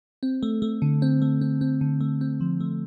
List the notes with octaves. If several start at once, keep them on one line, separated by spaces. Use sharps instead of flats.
C4
A3
A3
D3
C4
A3
C4
C4
D3
A3
C4
F3
A3